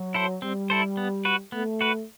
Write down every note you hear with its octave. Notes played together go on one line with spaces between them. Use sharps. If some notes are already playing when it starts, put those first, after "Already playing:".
Already playing: F#3
E4 A4 C5
G3 C4
E4 A4 C5
B3
F#4 B4
A3 B3
F#4 B4